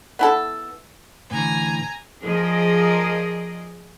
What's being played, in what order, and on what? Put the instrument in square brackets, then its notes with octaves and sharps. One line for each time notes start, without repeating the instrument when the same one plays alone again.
[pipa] B3 E4 A4
[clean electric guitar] A2 D3 E3 [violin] G#5 A#5
[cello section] F3 G#4 A#4 D5 D#5